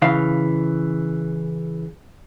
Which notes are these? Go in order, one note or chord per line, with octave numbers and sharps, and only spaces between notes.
C#3 E3 F5